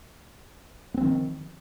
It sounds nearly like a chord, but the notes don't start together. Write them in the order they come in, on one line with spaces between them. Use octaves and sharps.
B3 C4 F3 D#3